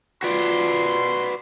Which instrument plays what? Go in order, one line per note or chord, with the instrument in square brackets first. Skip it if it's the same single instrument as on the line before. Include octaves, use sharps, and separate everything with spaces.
[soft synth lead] F4 [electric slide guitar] F#4 B4 D5 [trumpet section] C6